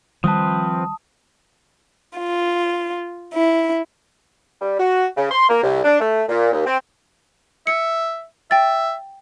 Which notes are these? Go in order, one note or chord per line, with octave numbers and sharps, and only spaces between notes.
D#3 F3 G3 C4 B4 A5 D#6
F4
E4
G3
F#4
C#3
C6
A#3
C2
D4
A3
A#2
D#2
C4
E5 C#7
E5 G5 A6